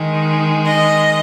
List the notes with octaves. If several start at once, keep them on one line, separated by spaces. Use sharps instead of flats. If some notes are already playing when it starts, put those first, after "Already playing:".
Already playing: D#3 G#3
D#5